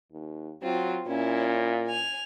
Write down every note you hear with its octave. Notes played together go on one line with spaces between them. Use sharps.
D#2
F#3 C4 F4
A#2 C#4 E4
G#5 F7